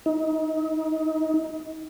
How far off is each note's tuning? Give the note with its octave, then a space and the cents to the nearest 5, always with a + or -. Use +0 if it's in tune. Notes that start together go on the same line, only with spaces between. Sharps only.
D#4 +30